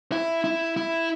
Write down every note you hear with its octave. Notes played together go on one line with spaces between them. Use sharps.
E4
E4
E4